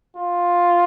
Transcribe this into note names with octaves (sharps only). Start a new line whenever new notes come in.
F4